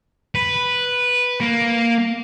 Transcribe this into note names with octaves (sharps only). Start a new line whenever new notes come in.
B4
A#3